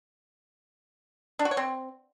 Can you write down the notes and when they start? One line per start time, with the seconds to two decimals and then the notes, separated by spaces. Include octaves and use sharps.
1.39 D4
1.45 F#4
1.51 C#5
1.57 C4